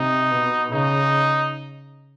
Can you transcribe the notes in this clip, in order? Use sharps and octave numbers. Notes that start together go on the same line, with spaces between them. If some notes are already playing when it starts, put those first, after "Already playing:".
Already playing: C3 D#4
B2
C#3 D#4